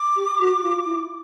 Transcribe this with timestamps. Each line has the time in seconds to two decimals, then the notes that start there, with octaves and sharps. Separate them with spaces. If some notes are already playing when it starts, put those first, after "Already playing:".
Already playing: D6
0.16 G4
0.40 F#4
0.58 F#4
0.62 F4
0.86 E4